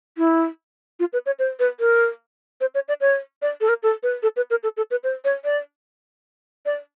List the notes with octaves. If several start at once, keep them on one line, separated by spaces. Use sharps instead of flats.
E4
F4
B4
C#5
C5
B4
A#4
C5
C#5
D5
C#5
D5
A4
A#4
A4
B4
A4
B4
A#4
A4
A4
B4
C5
C#5
D5
D5